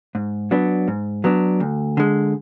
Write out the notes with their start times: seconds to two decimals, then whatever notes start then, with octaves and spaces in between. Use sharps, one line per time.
0.15 G#2
0.51 F#3 B3 D4
0.88 G#2
1.24 F#3 B3 D4
1.60 D2
1.97 D3 G#3